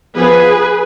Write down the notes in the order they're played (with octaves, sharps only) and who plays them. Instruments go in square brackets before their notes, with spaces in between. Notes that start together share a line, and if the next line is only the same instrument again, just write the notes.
[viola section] F3 B3 G#4 B4